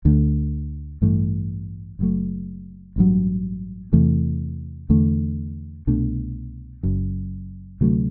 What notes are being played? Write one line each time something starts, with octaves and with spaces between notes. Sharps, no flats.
D2 D3 A3
A1 G2 E3 A3
F#1 F#2 F#3 A3
A1 G2 F#3
E2 C3 E3 A3
E2 D3 A3
C2 B2 A3 D4
F#1 F#2 F#3
D2 C3 F#3 A3